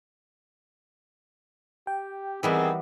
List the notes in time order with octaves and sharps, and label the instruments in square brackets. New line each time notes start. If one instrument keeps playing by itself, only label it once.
[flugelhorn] G4 [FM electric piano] G5
[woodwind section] D#3 C4 [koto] E3 G3 B3 [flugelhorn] G#4